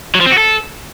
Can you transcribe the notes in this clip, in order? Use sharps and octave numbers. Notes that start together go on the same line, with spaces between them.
F#3
F3
C4
F#4
A4